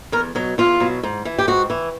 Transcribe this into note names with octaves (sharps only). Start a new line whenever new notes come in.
E2 A#4
B2 F#3
E2 F4
B2 F#3
G#2
E3
G4
G#2 F#4
E3